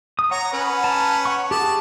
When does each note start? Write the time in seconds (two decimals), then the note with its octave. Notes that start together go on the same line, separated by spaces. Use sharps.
0.19 D#6
0.31 C#5 F#5 A#5
0.53 C#4 B4
0.84 A5 A#5
1.25 F#5 C#6
1.51 G4 G#4 A5 D6